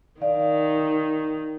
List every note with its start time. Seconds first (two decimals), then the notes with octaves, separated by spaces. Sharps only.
0.21 D#3 D5 F5